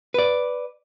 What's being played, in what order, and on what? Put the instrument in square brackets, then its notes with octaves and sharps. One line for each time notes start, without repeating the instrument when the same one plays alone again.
[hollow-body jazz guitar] B4 D5